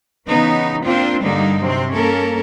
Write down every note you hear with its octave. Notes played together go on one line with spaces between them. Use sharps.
C#3 E3 B3 D#4
A#3 C4 D4 F4 C5
G2 D3 G3 A#3 D#4
C3 F#3 C4
A#3 C#4 A4 A#4